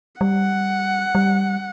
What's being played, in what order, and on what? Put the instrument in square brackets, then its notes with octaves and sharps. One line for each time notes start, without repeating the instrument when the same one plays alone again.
[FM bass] G3 [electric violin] F#5
[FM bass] G3